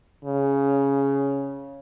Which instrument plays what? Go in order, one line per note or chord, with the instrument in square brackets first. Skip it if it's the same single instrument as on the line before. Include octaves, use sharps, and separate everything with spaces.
[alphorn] C#3